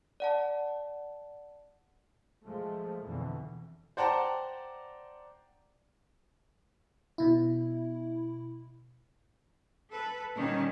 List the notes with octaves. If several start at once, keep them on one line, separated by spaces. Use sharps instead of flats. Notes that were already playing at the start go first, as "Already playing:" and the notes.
D5 F#5 A5
F3 G#3 A3
F2 B2 D3 E3
C5 D5 F#5 G5 A5 A#5
B2 E4
A4 B4
A#2 D#3 G3 C#4